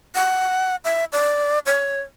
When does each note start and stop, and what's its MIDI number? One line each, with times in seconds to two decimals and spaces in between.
0.15 0.76 78
0.85 1.05 76
1.13 1.59 74
1.66 2.01 73